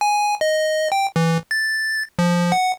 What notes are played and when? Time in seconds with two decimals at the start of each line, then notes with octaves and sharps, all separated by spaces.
0.01 G#5
0.41 D#5
0.92 G5
1.16 E3
1.51 A6
2.19 F3
2.52 F#5